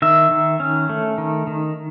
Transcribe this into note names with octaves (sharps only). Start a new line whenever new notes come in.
D#3 E5
D#3
C#4
A3
D#3
D#3